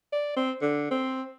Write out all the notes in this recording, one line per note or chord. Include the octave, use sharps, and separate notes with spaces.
D5
C4
D3
C4